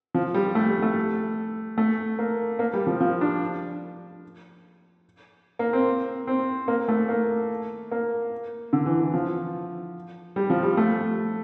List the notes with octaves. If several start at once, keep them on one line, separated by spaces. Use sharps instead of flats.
F3
G3
A3
G3
A3
A3
A#3
A#3
G3
F3
F3
D4
A#3
C4
C4
A#3
A3
A#3
A#3
D3
E3
E3
F3
G3
F3
G3
A3